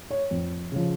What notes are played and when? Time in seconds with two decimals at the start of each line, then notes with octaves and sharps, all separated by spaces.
0.11 C#5
0.31 F2
0.72 C#3 F3